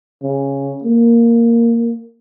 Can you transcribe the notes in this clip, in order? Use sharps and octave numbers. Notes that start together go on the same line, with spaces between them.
C#3
A#3